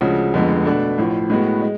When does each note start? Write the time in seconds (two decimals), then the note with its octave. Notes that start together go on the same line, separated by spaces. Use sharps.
0.01 D2 C#3 F3 G#3
0.34 F1 F2 D3 G#3 B3
0.65 B2 A3 D4
0.98 A1 A2 F3
1.30 A2 G#3 B3 F#4
1.62 G#3